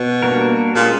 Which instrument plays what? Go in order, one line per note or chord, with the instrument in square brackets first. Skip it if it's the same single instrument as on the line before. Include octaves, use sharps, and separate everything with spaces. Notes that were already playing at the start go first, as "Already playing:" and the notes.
Already playing: [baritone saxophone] B2
[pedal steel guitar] G3 A#3 D4 F#4 A#4
[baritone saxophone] A#2 [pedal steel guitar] G#3 C#4 F4 G#4 C5